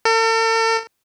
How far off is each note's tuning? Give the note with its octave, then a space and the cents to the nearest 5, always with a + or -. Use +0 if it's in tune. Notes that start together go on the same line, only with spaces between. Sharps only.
A4 +45